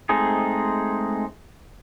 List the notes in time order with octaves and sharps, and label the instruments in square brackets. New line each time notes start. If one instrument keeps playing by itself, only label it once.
[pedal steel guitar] G#3 A3 C4 D#4 G#4